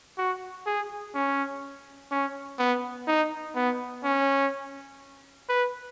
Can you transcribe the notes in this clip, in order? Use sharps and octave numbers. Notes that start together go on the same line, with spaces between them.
F#4
G#4
C#4
C#4
B3
D#4
B3
C#4
B4